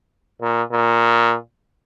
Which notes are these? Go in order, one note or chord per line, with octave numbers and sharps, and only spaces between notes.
A#2
A#2